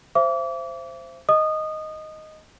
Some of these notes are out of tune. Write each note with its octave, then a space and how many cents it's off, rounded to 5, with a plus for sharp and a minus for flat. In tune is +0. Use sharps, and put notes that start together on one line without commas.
C5 +0 E5 +35 D6 -30
D#5 +0 D#6 -20